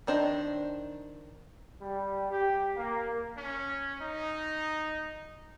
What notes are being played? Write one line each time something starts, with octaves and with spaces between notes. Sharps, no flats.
D#3 D4 C5 D#5
G3
G4
A#3
C#4
D#4